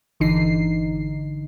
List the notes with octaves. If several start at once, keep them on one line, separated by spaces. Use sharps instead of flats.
G1 D3 E3 D#4 C7